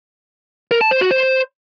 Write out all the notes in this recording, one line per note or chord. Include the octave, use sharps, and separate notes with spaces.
A#4
A5
C5
F#4
C5